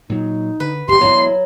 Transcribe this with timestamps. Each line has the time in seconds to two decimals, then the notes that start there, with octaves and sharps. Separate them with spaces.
0.09 A#2 F#3 D#4
0.60 D3 B4
0.88 D1 D#2 G4 C6
1.01 E1 F#2 F#3 B3 E4